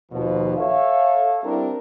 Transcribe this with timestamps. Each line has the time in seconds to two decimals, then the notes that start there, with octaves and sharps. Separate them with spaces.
0.12 D#2 B2 F3
0.58 A4 C#5 E5 F5
1.43 G3 C4 D4 E4 G4 A#4